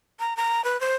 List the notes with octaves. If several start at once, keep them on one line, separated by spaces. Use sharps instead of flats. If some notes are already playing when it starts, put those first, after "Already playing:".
A#5
A#5
B4
C5